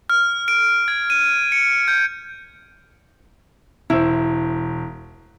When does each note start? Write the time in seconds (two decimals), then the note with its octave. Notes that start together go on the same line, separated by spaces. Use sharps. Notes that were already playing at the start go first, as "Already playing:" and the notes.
0.10 F6
0.48 D7
0.88 G#6
1.10 D#7
1.52 C#7
1.88 G6
3.90 E1 E4 C5